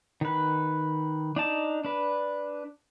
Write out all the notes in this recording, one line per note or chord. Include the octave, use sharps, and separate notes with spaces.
D#3 B4
D4 D#4 A5
D4 B4